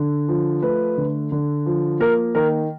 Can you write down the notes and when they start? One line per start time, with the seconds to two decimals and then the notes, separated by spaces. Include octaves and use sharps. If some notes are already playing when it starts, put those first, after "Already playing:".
Already playing: D3
0.29 F3
0.62 A3 B4
0.98 D3
1.32 D3
1.66 F3
2.00 A#3 A#4
2.35 D#3 A#4